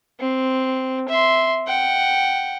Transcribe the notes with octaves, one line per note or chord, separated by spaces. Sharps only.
C4
E5 C6
F#5 G5